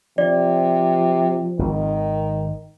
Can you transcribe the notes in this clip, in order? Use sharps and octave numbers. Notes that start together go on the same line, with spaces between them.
C3 F3 D5
G#1 D#3